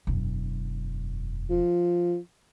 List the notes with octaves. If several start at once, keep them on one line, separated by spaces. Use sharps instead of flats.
E1 F#2
F3